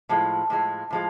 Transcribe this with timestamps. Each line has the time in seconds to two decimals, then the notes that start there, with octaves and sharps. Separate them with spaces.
0.09 A2 F3 G#3
0.50 A2 F3 G#3
0.91 A2 F3 G#3